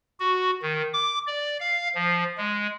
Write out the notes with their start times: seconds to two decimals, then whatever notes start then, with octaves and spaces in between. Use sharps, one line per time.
0.20 F#4
0.62 D#3
0.94 D6
1.27 D5
1.60 F5
1.95 F3
2.37 G#3